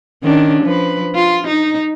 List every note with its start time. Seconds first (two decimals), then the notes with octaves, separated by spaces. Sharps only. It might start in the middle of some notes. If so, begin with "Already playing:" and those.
0.23 D#3 C#4 D4
0.62 F3 B4
1.15 F4
1.47 D#4